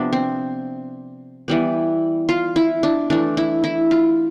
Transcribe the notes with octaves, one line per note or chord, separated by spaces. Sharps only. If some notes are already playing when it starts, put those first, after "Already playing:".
Already playing: C3 F3 B3 D4
C4
E3 G3 B3
F4
E4
D4
E3 A3 D4
E4
E4
F4